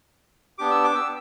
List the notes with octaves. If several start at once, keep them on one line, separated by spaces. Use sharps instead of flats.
B3 D4 G4 D6
E6
D6
E6